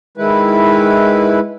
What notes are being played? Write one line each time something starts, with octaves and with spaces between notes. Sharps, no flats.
D#3 G#3 E4 B4